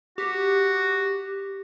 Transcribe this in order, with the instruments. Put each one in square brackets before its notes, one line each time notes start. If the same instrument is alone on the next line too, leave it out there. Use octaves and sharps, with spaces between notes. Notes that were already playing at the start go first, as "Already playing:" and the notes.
[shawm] F#4 [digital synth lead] G4